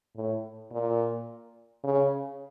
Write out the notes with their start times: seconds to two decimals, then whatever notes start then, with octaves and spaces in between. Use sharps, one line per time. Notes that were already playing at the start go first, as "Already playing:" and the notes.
0.16 A2
0.71 A#2
1.84 C#3